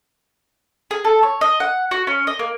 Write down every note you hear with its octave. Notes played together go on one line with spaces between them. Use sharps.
G#4
A4
C#5
D#5
F#5
F#4
C#4
D#5
A#3